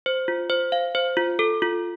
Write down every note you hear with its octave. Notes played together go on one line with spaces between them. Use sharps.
C5
F4
C5
F5
C5
F4
A4
F4